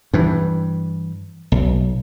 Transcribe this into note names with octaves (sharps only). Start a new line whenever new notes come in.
G2 E3
B1